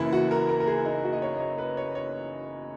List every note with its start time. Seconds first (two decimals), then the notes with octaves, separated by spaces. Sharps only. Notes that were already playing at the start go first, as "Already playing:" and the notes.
Already playing: F#1 F#2 E3 A#3 E4
0.13 F#4
0.31 A#4
0.49 A#4
0.60 A#4
0.67 G#4
0.85 D#4
1.04 F#4
1.13 D#5
1.22 C#5
1.36 D#5
1.40 C#5
1.58 B4
1.77 C#5
1.95 C#5